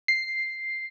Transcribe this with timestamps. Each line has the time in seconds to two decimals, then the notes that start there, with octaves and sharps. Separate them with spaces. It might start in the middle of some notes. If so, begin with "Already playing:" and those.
0.08 C7